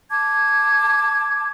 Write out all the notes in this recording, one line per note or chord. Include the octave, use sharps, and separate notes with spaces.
A5 D6 G#6